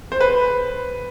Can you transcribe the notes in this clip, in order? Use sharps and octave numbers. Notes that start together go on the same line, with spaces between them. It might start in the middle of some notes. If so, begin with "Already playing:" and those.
C5
B4